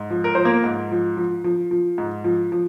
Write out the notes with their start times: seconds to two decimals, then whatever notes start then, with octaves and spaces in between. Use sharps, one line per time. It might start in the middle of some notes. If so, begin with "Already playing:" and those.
Already playing: G#2
0.10 F3
0.24 A#4
0.35 F3 C5
0.45 A#3 A#4
0.64 G#2
0.91 F3
1.17 F3
1.44 F3
1.71 F3
1.98 G#2
2.24 F3
2.52 F3